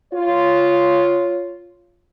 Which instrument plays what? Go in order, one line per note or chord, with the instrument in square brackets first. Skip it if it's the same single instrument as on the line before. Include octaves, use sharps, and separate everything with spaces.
[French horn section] F4 C#5